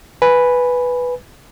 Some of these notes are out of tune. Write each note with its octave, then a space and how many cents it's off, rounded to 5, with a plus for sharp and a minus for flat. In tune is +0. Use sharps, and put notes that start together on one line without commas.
B4 +0 G#5 +0